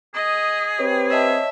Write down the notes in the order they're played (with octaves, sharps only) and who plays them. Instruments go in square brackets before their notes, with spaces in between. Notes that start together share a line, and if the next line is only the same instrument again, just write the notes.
[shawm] G#4 [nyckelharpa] D#5
[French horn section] C4 G4 B4 [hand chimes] C#5
[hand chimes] C#5 D#5 A5 [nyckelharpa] E5